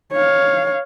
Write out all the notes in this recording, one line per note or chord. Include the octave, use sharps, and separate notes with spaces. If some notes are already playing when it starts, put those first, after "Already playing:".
C#5 F5